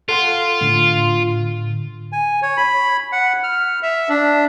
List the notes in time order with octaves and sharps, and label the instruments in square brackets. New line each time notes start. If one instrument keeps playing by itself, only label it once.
[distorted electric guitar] F4 [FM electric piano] A4 F#5 C6
[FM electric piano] A2 D3
[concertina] G#5
C#5
B5
F#5
F6
E5
D4